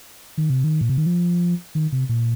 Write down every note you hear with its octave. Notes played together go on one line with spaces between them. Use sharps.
D#3
C3
D#3
A#2
C3
D#3
F3
D#3
C3
A#2